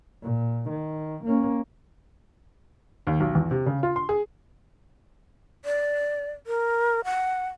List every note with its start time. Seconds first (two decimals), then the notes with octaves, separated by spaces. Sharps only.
0.23 A#2
0.70 D#3
1.24 A#3 C#4
3.07 D#2
3.20 B1
3.35 E2
3.51 C3
3.66 C#3
3.83 F4
3.96 C6
4.09 G#4
5.65 D5
6.47 A#4
7.05 F#5